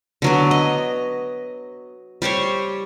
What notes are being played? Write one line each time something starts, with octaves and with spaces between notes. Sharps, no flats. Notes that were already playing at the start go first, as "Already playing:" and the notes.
D3 F#3 B3
D#5
G3 G4 C5 C#5